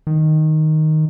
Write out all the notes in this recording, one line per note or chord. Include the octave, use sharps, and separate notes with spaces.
D#3